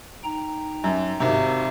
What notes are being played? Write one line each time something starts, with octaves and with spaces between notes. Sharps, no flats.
D#4 G5 A#5
F#2
G#1 C3 D#4 F#4